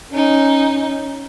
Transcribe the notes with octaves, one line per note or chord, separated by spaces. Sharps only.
C#4 D#4